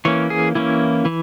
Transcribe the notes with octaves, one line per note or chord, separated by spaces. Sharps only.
E3 A#3 C#4 C#5
G#4
E3 A#3 C#4 E4
E3